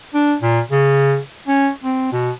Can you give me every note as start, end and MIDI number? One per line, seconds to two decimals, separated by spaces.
0.14 0.35 62
0.41 0.60 46
0.71 1.18 49
1.48 1.70 61
1.84 2.08 60
2.12 2.31 47